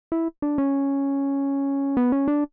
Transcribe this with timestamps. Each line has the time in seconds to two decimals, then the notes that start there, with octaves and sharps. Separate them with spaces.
0.12 E4
0.42 D4
0.58 C#4
1.97 B3
2.12 C#4
2.28 D4